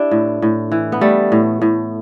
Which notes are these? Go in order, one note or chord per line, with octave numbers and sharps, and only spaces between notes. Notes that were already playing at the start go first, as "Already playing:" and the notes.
Already playing: D4 E4 G4
A2
A2
E3
B3
G3 A3
A2
A2